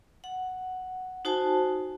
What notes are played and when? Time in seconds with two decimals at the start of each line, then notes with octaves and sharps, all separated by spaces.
0.24 F#5
1.25 D#4 F#4 C5 G#5 A5